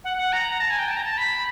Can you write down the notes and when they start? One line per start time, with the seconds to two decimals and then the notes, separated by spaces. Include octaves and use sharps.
0.04 F#5
0.17 F#5
0.33 A#5
0.60 A5
0.70 G#5
0.79 G5
0.89 A5
0.96 A#5
1.04 A5
1.18 B5